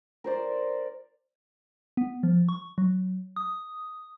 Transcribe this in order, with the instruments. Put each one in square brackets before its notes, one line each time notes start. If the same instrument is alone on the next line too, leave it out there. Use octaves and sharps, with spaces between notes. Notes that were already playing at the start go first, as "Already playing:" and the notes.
[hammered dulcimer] A#4 C5 D5
[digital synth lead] B3
F3
C#6
F#3
D#6